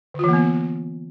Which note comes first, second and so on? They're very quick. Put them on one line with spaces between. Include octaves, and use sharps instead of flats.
D3 F4 E3 A#3 B3